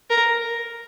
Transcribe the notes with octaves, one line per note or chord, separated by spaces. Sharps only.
A#4